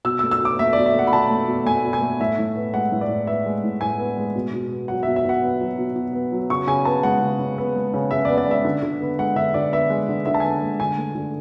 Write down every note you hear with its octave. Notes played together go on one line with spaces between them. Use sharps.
B2 E6
E6
A3
E6
B2 D6
A3 E5
B2 D5
E5
A3 F#5
B5
B2 A5
A3
B2
A3 G#5
B2
G#5
A3
A2 E5
A2
B3
G#3 F#5
A2
D5
A2
B3 E5
G#3
A2
A2 G#5
B3
G#3
B2
B2
B3
F#3 F#5
B2 E5
E5
B2 F#5
B3
F#3
B2
B2
B3
F#3
C#3 C#6
C#3 G#5
B3 A5
G#3 F#5
C#3
C#3
B3
G#3
C#3
C#3 E5
D5
B3
D5
G#3 E5
D3
D3
B3
G#3 F#5
D3 E5
D3 D5
B3 E5
G#3
D3
D3 E5
A5
B3 G#5
G#3
D3 G#5
A3
D3